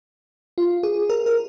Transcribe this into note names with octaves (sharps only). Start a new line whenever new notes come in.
F4
G#4
A#4
A#4